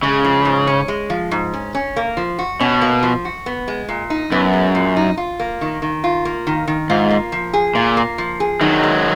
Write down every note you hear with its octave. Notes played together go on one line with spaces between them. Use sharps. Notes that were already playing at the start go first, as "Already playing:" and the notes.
C#3 G#3
F3
G#2
C#4
G#3
F3
G#2
C#4
C#4
A#3
F3
F#4
B2 C#4
A#3
F3
F#4
B3
G#3
A#2
D#4
F#2 B3
G#3
A#2
D#4
F4
A#3
D#3
D#3
F4
A#3
D#3
D#3
G#2 F4
A#3
F3
G#4
A#2 F4
A#3
F3
G#4
D#3 F#3 D#4
G#3